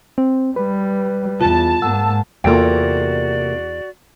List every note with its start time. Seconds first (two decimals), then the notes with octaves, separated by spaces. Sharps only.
0.18 C4
0.56 G3 B4
1.41 E2 F4 A5
1.82 G#2 A#3 F#5 E6
2.44 E2 C3 A#3 F4 F#4 A4 D5 G5